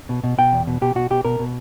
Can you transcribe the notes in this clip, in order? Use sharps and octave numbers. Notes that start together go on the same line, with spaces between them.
B2
B2
B2 G5
E2
B2
B2 G4
B2 F#4
B2 G4
B2 A#4
B2